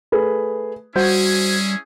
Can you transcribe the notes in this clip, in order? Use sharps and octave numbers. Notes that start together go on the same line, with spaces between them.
A3 G#4 B4
G3 C#4 E4 F#4 G#4 C5 G6